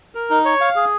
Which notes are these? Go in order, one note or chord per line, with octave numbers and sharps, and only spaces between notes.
A#4
D#4
C#5
F5
G#4